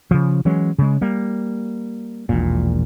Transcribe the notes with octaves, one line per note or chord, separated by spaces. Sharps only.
C#3 F3
E3 F#3 G#3 C#4
C#3 G#3
G3 A#3
E1 A#1 A#2